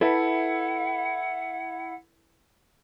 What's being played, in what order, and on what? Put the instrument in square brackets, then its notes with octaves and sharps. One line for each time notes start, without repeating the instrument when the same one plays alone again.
[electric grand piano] E4 [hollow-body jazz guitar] A4 B4 E5 [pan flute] F#5